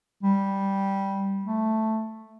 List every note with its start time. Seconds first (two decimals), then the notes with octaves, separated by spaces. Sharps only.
0.23 G3
1.45 A3